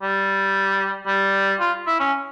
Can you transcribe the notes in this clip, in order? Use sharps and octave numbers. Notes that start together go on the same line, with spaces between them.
G3
G3
F4
E4
C#4